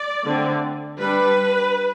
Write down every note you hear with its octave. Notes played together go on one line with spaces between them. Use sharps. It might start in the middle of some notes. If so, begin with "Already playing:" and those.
Already playing: D5
D3 A3 C4
G3 D4 B4